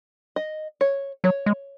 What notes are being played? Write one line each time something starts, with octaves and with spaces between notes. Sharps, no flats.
D#5
C#5
F#3 C#5
G#3